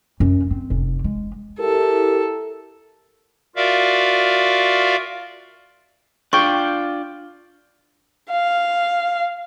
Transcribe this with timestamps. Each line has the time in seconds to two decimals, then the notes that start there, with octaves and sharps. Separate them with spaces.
0.20 F#2
0.51 C4
0.70 F1
1.04 G#3
1.59 E4 G4 A4 A#4
3.56 F4 F#4 A#4 D5 E5 F5
6.33 D4 F4 G5 C#6
8.31 F5